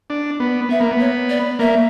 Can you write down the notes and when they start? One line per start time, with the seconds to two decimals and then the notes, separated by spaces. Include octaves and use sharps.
0.10 D4
0.40 B3
0.69 B3 E5
0.81 A#3
0.91 B3
0.99 C#5
1.29 D5
1.59 A#3 E5